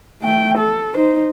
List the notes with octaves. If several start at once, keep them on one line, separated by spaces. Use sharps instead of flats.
A3 G5
A4
D#4 C5